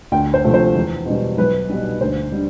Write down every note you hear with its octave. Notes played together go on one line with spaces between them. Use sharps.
D2 G5
C5
C3 F3 A3
C5
E2
B2 G3
B1 B4
B2 G3
D2 C5
D3 G3